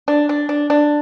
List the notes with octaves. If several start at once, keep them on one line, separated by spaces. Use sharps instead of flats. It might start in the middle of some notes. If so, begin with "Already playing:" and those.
D4
D4
D4
D4